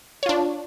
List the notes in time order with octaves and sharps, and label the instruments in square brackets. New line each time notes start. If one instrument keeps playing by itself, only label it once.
[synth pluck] C#5
F4
D4